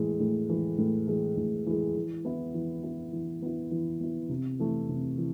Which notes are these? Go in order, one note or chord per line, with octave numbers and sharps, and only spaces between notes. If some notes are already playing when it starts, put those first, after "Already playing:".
Already playing: A2 E3 G#3
A2
E3 G#3
A2
E3 G#3
A2
E3 G#3
E3
B3 E4
E3
B3 E4
E3
B3 E4
E3
B3 E4
C3
E3 A3 E4
C3
E3